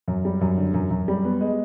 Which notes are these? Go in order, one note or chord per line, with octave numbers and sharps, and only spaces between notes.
F#2
G3
F#2
D3
F#2
F#2
G3
B3
G#3